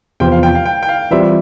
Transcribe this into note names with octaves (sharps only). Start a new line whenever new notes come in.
E2 C3 F3 C4 F4 G5
F5
G5
F5
G5
G5
F5
E3 G3 C4 F4 E5